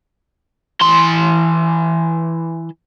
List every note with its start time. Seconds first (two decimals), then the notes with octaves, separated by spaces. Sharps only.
0.81 E3 C6